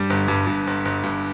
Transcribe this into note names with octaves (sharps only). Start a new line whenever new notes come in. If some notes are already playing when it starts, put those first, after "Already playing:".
Already playing: G2 G3
G1
G2
G2
G1
G1
G2